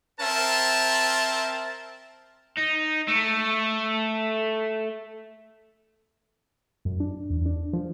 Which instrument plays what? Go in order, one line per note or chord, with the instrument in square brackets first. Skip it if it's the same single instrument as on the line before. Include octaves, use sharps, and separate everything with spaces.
[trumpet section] C4 A#4 E5 A5
[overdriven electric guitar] D#4
A3
[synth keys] F#2
D4
E2
D4
F3